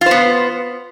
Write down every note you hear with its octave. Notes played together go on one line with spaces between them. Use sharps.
B3 F4 C5